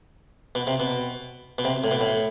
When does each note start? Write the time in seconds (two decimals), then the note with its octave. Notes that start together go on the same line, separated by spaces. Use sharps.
0.55 B2
0.67 C3
0.80 B2
1.58 B2
1.64 C3
1.84 A2
1.91 B2
2.01 A2